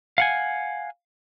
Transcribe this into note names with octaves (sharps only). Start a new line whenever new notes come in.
F5 F#5 G#5